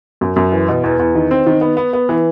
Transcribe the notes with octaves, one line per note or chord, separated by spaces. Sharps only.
F#2
F#2
E3
B2
E2
E2
D#3
C4
D#3
B3
B3
B3
E3